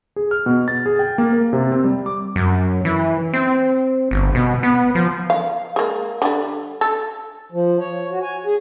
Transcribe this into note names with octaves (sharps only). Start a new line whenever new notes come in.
G#4
F6
B2
A6
G#4
G5
A#3
A#4
C3
C4
G3
D6
F#2
E3
C4
G1
B2
B3
F3
F5
G#3 A#3
D3 G3
A4
F3
C#5
F#4
G#5
G#4